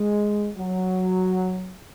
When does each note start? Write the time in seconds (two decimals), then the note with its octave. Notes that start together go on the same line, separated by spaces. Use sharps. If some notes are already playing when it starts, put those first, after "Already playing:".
Already playing: G#3
0.57 F#3